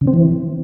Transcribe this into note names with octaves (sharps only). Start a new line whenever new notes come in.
C#3
C4
E3